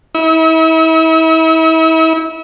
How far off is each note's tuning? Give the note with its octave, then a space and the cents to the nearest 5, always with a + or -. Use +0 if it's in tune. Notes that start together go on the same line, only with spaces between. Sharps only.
E4 -40